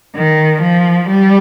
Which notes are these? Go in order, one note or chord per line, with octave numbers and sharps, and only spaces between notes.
D#3
F3
G3